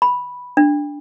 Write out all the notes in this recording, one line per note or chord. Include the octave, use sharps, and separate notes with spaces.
B5
D4